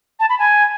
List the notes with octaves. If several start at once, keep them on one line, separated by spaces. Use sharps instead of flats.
A5
B5
G#5